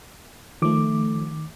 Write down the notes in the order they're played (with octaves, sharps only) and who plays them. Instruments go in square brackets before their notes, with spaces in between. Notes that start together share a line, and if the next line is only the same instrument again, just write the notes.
[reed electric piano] D#3 D6 [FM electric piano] F3 A3